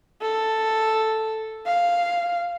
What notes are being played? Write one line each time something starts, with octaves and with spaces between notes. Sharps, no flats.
A4
F5